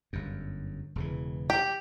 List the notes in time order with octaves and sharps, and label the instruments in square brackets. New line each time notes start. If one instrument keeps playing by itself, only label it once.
[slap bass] G1 F#2
E1 C#3 E3
[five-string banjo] G4